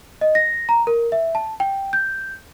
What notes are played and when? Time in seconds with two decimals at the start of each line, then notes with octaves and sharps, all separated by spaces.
0.21 D#5
0.35 A#6
0.69 A#5
0.87 A#4
1.12 E5
1.35 A5
1.60 G5
1.93 G6